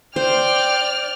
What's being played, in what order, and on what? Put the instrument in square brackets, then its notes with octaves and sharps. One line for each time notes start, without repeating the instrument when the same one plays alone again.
[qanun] C5 [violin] D5 F6 [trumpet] G5